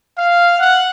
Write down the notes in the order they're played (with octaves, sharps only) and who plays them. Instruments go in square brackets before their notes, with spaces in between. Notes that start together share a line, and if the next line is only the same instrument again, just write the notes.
[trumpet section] F5
F#5